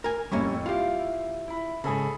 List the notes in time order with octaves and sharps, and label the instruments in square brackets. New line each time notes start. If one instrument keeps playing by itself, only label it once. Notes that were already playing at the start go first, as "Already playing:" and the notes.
[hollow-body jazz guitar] A#4 G#5
[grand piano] F2 A2 C#6 [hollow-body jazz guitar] G3 A#3 C#4
[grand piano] E4 F5 [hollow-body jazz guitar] F4 G4
[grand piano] E4
E4 B5
[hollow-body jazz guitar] G#2 C#3 [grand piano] G#4 A4 B5